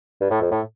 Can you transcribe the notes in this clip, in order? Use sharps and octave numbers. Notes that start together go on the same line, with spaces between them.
G2
A2
F2
A2